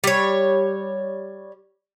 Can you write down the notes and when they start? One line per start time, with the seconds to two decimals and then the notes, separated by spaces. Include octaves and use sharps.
0.04 G3 C#5